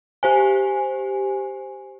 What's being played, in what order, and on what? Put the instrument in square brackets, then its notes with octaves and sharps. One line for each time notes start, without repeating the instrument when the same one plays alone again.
[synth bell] G4 C5 G#5